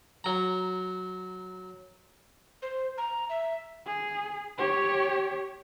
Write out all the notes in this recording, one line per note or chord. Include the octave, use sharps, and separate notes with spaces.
F#3 A#5
C5
A#5
E5
G#4
G4 C#5